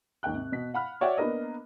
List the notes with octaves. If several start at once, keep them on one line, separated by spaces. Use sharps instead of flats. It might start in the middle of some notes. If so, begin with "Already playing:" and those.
D#2 G#2 G5 F#6
C3
B2 B6
F5 F#5 B5 F6
F#4 C#5 D5 E5 F#5 G5
A#3 B3 D4 A#4 D#5